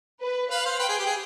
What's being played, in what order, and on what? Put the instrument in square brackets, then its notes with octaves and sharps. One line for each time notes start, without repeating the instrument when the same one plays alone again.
[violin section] B4
[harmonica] B4 [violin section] F5
[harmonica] C5
[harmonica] B4 [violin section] G5
[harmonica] G#4
G4
G#4